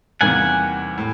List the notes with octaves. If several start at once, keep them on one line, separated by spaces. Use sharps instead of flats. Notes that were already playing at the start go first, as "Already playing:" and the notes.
E2 C3 D#3 G3 A#3 F#5 G#5
A2